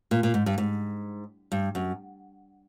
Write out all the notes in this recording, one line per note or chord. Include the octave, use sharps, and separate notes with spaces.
A#2
A#2
G#2
G2
G#2
G2
F#2